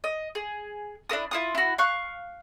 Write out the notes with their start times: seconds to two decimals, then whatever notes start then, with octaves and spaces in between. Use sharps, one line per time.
0.04 D#5
0.35 G#4
1.09 D4 E4 A#4 D#6
1.31 E4 F4 D#6
1.55 E4 F#4
1.78 F5 C#6 F#6